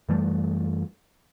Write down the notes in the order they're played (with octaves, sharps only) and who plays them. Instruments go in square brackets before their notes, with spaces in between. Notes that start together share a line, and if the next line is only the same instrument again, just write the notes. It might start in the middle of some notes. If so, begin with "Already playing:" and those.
[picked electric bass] F#2 E3 G3 A3